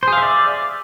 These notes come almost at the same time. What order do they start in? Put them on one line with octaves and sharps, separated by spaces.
C5 G#4 F5 E5 D5